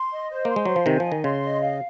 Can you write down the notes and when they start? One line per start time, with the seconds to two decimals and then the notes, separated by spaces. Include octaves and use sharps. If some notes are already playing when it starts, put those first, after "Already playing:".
Already playing: C6
0.12 D#5
0.31 C5
0.45 A#3 C6
0.56 G#3
0.65 F#3 C5
0.76 F3
0.86 C3 D#3 G#5
1.00 F3 D#5
1.12 D#3
1.24 C#3 C6
1.42 D#5
1.61 F5